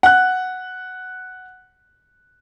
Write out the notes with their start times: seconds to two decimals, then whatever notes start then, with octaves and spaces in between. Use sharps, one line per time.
0.03 F#5 F#6